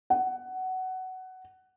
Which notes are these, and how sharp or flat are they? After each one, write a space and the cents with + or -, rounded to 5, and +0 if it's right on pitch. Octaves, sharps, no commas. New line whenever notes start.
F#5 +15